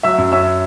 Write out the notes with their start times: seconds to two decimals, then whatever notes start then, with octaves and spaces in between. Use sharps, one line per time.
0.03 F#3 E5 E6
0.18 F#2
0.32 C#4 E5 E6